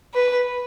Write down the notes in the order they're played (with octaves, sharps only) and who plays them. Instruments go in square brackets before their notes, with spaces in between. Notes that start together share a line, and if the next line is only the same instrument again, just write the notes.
[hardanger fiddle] B4